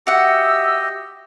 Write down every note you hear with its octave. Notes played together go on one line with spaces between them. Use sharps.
F#4 G4 D#5 E5 F#5 E6